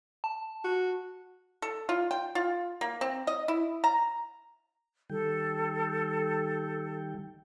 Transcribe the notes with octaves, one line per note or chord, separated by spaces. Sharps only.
A5
F#4
A4
F4
G5
F4
A#3
C4
D#5
E4
A#5
D#3 G3 A4 G5